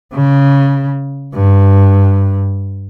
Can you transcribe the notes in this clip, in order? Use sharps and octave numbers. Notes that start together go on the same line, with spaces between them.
C#3
G2